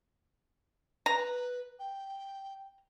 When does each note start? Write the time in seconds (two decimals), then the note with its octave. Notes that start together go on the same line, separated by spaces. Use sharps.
1.06 B4 A#5
1.79 G5